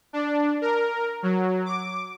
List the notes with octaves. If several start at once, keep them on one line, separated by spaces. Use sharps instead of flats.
D4
A#4
F#3
D6